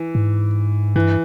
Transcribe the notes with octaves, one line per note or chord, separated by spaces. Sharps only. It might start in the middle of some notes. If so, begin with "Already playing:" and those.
Already playing: E3
G#2
G2 E3